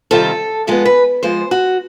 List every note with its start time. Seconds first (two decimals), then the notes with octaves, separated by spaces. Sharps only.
0.11 C3 D#3 G3 C4 F4 A4
0.67 F3 G#3 B3 A4
0.85 B4
1.23 F3 G#3 B3 C5
1.51 F#4